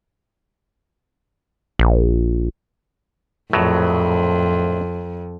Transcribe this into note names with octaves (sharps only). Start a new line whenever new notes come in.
A#1
A#1 F2 A2 F#3